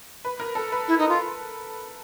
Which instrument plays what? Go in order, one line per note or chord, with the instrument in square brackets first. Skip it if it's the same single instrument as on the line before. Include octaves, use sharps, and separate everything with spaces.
[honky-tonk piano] B4
A#4
A4
B4
[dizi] E4
D#4
F4